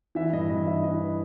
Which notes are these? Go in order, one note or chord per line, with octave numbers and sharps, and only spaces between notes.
E3 E5
G2 D#5
G2 D#5
E3 E5
E3 D#5
B4